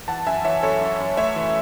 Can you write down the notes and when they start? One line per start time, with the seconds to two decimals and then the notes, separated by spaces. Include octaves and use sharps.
0.08 E3 F#5 A5
0.26 F#2 E5 G#5
0.45 E3 C#5 E5
0.63 F#2 A4 C#5
0.81 F#2
1.00 F#2
1.17 A3 C#5 E5
1.36 E3